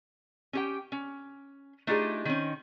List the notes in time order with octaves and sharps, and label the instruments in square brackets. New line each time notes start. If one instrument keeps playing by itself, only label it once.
[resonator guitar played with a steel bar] C#4 G4 G5
C#4
A3 D4 D#4 F4 G4 G#4
D#3 C4 C#4